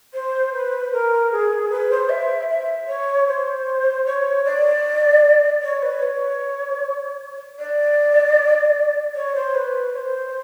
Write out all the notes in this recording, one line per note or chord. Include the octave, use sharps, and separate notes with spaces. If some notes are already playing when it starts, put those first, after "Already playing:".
C5
B4
A#4
G#4
B4
C5
E5
E5
C#5
C5
C#5
D5
C#5
B4
C#5
D5
C#5
C5
B4
C#5
C5